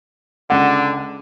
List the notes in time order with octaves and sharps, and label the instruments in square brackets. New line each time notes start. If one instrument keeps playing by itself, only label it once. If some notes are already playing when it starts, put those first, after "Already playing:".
[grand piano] C#2 F#5 [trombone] D3